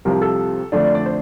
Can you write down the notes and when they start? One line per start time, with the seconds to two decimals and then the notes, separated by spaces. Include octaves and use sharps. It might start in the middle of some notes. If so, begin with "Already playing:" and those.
0.05 C2 C3 F3 A#4
0.22 A4
0.72 F2 D3 A3 D4
0.84 D5
0.95 D5
1.06 C5